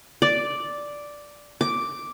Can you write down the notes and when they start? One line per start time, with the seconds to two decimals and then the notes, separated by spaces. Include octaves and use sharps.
0.22 D5
1.61 D6